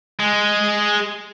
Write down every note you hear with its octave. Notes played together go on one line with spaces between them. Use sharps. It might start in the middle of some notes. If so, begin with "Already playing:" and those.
G#3